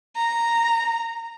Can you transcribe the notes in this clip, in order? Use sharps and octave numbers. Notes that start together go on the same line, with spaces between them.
A#5